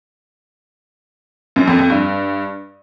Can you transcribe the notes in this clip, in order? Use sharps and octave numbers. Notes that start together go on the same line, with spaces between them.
F#2
F2
F2
G2